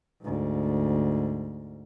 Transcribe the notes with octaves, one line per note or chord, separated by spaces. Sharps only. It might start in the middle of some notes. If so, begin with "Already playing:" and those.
D2 G#2